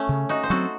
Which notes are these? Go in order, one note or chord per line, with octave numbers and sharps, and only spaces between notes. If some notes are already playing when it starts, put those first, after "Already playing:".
Already playing: A3 C#4
C#3
D#4 F#4
C5
F#3 C4 F#4 A4